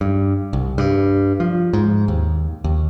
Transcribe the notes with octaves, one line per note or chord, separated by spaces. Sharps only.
G2
C2
G2
F3
G#2
D#2
D#2